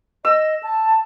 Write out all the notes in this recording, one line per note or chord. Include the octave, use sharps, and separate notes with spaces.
D#5 E6
A5